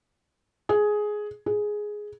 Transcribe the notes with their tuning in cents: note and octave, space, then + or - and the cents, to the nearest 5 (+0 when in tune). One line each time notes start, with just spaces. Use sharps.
G#4 +10
G#4 +5